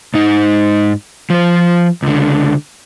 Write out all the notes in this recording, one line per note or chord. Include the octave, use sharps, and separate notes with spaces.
G#2 D#4
F3 C5
C#2 D3